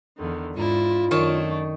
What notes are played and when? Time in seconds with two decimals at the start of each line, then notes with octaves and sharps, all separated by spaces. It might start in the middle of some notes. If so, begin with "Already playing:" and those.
0.17 E2 D3 D#3
0.54 G#2 D4 E4 F4
1.11 F#2 D#3 A3 D4 C#5 A5